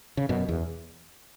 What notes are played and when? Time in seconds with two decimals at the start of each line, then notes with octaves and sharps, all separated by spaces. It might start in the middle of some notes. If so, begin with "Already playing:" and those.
0.17 C#3
0.29 F#2 B2
0.49 E2